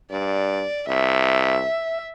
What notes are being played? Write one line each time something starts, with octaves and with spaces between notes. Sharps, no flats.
G2 D5
C2 E5